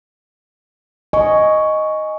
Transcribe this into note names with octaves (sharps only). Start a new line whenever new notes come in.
D#5 G#5 C#6